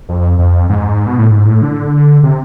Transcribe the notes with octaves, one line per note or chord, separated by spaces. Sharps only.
F2
F2
G#2
B2
A2
G#2
A2
D3
C3